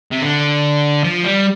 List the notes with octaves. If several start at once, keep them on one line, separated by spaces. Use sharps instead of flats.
C3
D3
F3
G3